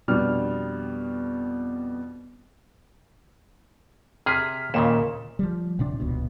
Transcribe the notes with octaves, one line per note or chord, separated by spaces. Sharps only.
F2 B2 G3 D4 F6
C3 G#4 F6 B6
D#2 A#2 C#3 A#3 E7
F3 G3
D#1 C3 D4
D#1 C#2 B2